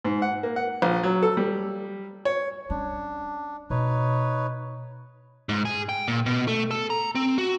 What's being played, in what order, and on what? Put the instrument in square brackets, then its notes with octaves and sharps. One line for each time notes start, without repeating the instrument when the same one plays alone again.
[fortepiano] G#2
F#5
A#3
F#5
A#1
F#3
A4
G3
C#5
[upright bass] G3 C#4 [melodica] D4
[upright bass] B2 [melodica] D#4 B4 C#5
[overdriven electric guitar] G#2
G#4
G5
A#2
B2
A3
A4
A#5
C4
F#4